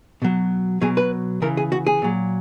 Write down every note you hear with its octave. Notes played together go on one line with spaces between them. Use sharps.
B2 F#3
B2 F#3 G#4
B4
C#3 E3 A#4
G#4
F#4
G#4
A#2 F#3